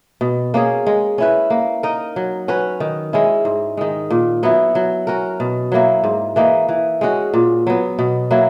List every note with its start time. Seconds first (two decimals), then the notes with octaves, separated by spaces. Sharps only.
0.21 B2
0.54 A#3 C#4 G#4
0.87 G#3
1.18 C#4 E4 B4
1.50 A#3
1.83 D#4 A#4 D#5
2.16 F#3
2.48 C#4 F#4 B4
2.80 D#3
3.13 G#3 C#4 E4
3.45 G#2
3.77 D#3 G#3
4.11 A#2
4.43 F#3 B3 E4
4.75 F#3
5.07 C#4 F#4 A#4
5.40 B2
5.72 F#3 A#3 E4
6.04 G#2
6.36 E3 A#3 D#4
6.69 E3
7.01 G#3 C#4 F#4
7.34 A#2
7.67 F#3 B3
7.99 B2
8.31 F#3 A#3 E4